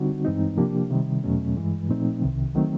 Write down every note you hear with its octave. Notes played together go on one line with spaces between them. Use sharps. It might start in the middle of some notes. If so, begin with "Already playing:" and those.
Already playing: D3 G3 C4 D#4 F#4
G2 E3 G#3 C4 D#4
C3 F3 A#3 D4 G4
C3 D#3 G3
E2 B2 F#3 A3 C#4
G2 E3 G#3
A#2 F3 A3 C4 D#4
C2 C3 D#3
D#3 F#3 A3 C4